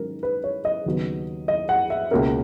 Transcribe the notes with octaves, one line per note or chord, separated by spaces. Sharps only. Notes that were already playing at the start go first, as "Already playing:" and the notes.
Already playing: G#2 D#3 F#3 C#4 A#4
B4
C#5
D#5
D#2 C#3 F#3 B3
D#5
F#5
E5
C#2 B2 A#3 C#4 A#4